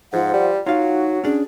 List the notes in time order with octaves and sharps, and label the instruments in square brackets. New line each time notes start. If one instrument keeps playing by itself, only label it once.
[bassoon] G#2 [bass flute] F3 [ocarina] F#5
[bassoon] G3
[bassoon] F#3 [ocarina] D#4 [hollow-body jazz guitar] F4 F5 [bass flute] F#4
[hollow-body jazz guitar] C#4 D4 [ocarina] G#4